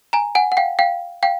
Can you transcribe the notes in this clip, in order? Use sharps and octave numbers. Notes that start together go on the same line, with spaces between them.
G#5 A#5
F#5 G#5
F#5
F5 G5
F5 G5
F5 G5